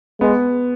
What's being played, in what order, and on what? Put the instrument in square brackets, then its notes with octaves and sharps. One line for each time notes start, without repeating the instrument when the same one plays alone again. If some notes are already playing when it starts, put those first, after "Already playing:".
[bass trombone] G#3 [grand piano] B3